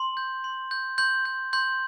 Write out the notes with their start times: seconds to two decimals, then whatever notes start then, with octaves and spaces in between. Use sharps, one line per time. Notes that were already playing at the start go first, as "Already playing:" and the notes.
Already playing: C6
0.17 G6
0.44 C6
0.71 G6
0.98 C6 G6
1.25 G6
1.53 C6 G6